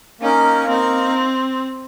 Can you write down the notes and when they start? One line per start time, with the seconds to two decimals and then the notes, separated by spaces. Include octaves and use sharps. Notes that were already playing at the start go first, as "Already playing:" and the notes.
0.21 A#3 C#4 D#4 A#4
0.67 A#3 C4 D#4 A#4